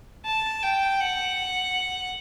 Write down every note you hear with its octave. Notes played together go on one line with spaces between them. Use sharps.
A5
G5
F#5